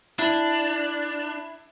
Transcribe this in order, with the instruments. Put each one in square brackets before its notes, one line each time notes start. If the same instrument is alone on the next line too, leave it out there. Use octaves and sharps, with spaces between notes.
[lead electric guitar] D4 [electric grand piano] E4